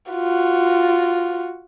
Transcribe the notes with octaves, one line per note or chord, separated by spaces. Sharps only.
F4 F#4